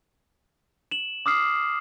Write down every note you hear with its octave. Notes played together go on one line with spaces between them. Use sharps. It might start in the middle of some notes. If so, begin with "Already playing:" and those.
E7 F#7
D6 D#6 F6 C7